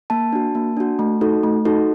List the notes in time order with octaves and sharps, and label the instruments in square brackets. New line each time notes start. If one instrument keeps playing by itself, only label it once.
[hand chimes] A#3 A5
D4 F#4
A#3
D4 F#4
A3
D#4 F#4 A4
A3
D#4 F#4 A4